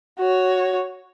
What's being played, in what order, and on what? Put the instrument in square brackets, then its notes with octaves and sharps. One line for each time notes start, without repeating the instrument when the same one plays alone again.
[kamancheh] F#4 C#5